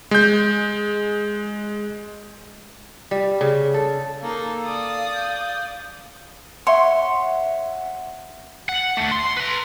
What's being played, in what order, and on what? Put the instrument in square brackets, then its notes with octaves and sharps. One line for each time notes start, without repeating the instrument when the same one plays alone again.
[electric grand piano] G#3 G6
[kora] G3
C#3
A4
[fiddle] A#3 D#4 [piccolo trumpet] A4 [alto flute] F5
[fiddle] D5 D#6
[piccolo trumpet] G6
[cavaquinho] C#5 C6 [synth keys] E5 F#5
[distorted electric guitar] F#5
A3 D4
C6
B4 A#5